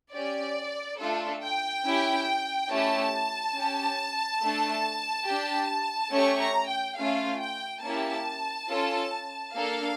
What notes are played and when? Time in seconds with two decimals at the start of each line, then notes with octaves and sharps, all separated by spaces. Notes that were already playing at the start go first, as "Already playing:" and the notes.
0.13 C#4 G4 D5
0.98 A3 D4 F4 A4
1.41 G5
1.84 C#4 E4 G4
2.69 A3 C#4 E4 G4 A5
3.54 C#4 G4
4.40 A3 D4 A4
5.26 D4 G4
6.11 A3 C#4 G4 C#6
6.41 A#5
6.68 G5
6.97 A3 C#4 F4 F5
7.40 G5
7.83 A#3 C#4 E4 G4 A5
8.68 C#4 F4 A4
9.53 A#3 D4 A4 F5